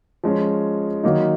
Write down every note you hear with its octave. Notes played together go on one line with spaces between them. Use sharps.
F3 G#3 C#4
D#3 F#3 A#3 D#4